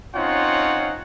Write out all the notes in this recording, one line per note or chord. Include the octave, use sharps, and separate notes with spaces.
C4 C#4 D#4 F4 C#5 F#5